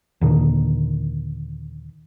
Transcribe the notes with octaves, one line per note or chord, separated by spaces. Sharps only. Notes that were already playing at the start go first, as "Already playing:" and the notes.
D#2 A#2 D3 D#3